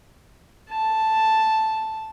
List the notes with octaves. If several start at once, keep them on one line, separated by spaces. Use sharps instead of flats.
A5